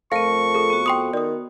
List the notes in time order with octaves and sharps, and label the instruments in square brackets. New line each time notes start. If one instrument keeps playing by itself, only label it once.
[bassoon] F2 [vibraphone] A3 F4 A#4 [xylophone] F5 D#7 [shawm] C#6
[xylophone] G#4 A4
[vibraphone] B3 F#4
[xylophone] G5 C6 D#6
[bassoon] D#3 [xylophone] D5 D#6